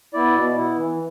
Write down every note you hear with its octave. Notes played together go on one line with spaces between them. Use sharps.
B3 E4 D5
B2
B3 E4
E3